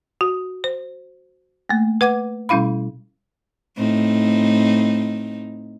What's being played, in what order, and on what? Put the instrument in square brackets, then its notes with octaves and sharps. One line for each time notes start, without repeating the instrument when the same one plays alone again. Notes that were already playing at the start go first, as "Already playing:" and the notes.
[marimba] F#4
C5
A3 A#3
B4 F#5 D6 G#6
B2 G3 C#4 E4 F5 B5
[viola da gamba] A2 C4 D#4